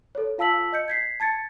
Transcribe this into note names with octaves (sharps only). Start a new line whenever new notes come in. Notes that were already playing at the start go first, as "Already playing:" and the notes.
A4 C#5
F4 F5 A5 E6 B6 F#7
D#5 G6 C#7
G#6 B6 C7
A5 G#6 A6 C#7